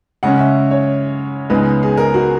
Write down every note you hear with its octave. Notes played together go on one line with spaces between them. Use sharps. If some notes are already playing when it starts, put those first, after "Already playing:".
C#3 G#3 C#4 F#5
E5
C#5
C#2 C#3 G#3 B3 D#4 B4
G#4
A#4
F#4